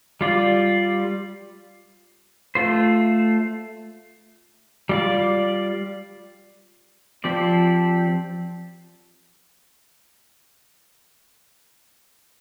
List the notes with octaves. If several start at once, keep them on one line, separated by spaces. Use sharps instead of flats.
G3 F4 D5
A3 F4 C5
G3 F4 D5
F3 C4 G4 D5